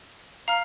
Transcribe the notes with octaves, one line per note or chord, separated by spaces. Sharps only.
F5 A#5 F6